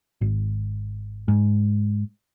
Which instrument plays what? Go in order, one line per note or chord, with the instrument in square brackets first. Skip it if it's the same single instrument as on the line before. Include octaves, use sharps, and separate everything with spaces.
[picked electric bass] G#1
G#2